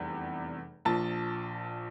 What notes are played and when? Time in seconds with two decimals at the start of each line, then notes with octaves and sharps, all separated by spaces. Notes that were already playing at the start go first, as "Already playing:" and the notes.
Already playing: F1 E2 C3 G3
0.85 A#1 A#2 F3 A5